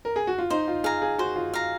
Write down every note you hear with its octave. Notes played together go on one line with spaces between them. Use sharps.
A#4
G#4
F#4
F4
D#4 C5
F4
G#4 F5 A#5
G#4
F#4 C5
F4
F5 A#5